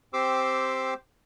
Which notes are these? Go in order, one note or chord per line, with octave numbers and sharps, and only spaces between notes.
C4 G4 C5 C6 D6 E6